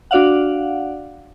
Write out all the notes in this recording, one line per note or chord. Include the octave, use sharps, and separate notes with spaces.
D4 F#4 D5 F5 F#5